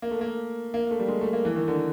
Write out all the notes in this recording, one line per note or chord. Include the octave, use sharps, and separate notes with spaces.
A#3
A3
A#3
A#3
A3
G3
G#3
A3
A#3
E3
D#3
D3